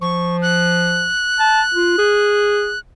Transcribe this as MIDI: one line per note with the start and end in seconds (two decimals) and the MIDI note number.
0.02 1.11 53
0.02 0.37 85
0.42 2.79 90
1.39 1.62 81
1.74 1.96 65
1.98 2.73 68